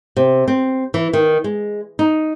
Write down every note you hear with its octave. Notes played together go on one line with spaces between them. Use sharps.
C3
C4
E3
D#3
G#3
D#4